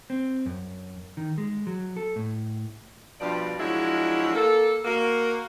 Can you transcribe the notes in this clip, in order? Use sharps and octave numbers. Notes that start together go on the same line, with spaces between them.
C4
F#2
D#3
G#3
F#3
A4
A2
G2 B2 F3 F4 D5
F3 F#3 G#3 C#4 D4 E4
A#3 A4
A#3 F#4